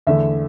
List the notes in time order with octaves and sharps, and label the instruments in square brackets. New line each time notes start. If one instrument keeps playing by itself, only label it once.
[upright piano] E2 D3 A3 E5